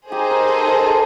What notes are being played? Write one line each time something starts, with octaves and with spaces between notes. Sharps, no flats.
D#4 G4 G#4 C5
A#4
A4
A#4
A4